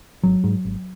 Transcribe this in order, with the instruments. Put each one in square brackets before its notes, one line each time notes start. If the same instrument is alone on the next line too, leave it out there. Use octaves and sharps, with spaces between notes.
[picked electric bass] G#1 F#3
G#2
G#1